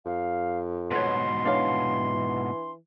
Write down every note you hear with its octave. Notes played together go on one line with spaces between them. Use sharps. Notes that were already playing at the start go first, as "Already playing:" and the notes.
F2 F5
G#2 B2 B4 C#5 C6
E3 D4 C#5 F5